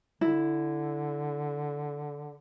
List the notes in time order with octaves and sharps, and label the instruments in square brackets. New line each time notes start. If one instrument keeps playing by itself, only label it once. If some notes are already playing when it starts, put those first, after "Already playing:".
[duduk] D3 [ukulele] E4